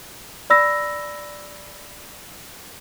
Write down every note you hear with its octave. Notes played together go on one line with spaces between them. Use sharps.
D5 B5 E6 A#6